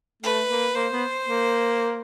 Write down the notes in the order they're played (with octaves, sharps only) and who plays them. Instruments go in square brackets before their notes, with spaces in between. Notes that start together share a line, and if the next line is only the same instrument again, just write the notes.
[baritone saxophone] A3 [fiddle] B4
[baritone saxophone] A#3
[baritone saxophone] A#3 [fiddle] C5
[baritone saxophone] B3
A#3